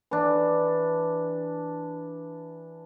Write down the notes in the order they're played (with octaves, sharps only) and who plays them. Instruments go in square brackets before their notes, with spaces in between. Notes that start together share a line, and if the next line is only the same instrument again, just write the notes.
[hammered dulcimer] E3 D4